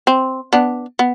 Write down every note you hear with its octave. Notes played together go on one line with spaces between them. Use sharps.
C4
B3 D4
B3